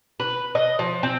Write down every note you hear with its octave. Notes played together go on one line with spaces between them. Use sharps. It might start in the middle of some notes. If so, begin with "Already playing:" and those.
B4
D#5
F3
C4